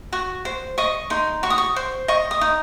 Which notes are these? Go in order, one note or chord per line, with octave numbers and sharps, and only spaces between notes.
F#4 C#6
C5
D#5 C#6
D#4 C6
F#4 C#6
D#6
C#6
C5
D#5 C#6
D#6
D#4